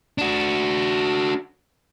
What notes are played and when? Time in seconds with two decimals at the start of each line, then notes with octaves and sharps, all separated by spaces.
0.18 D4 F#4